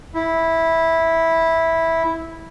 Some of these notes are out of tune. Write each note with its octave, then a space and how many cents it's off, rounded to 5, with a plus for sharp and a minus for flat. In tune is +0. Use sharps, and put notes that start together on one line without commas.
E4 -10